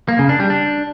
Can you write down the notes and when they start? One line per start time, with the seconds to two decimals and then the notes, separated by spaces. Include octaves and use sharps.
0.09 A#3
0.19 C#3
0.29 D4
0.40 G3
0.50 D4